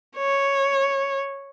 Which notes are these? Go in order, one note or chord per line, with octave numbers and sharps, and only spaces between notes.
C#5